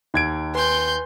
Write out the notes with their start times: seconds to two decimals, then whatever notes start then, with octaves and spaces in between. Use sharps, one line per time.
0.14 D#2 D#4 G#6 D7
0.55 B4 G#5 C6 G6